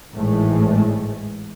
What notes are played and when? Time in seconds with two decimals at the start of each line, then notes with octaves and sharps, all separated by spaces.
0.14 G#1 A2 E3 G#3 A3